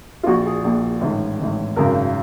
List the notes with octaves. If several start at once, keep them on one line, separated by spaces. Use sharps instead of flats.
F4
A#1 A#2 F#4
G#4
A#1 A#2
A1 G#2 D#3
A1 G#2 D#3
G#1 F#2 C#3 A#4